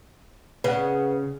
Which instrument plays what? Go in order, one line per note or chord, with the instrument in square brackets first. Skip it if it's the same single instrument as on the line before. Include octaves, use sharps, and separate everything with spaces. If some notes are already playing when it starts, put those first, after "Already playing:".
[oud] C#3 [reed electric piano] B4 F#5